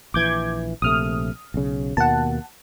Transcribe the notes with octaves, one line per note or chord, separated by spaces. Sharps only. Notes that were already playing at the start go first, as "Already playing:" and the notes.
A#1 E3 D6 G6 G#6
A#1 C3 A3 D#6 F6
B1 C#3
D#2 B2 A#3 F#5 A5